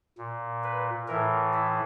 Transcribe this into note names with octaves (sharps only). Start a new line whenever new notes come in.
A#2
B4
A2 E3 A#4
E4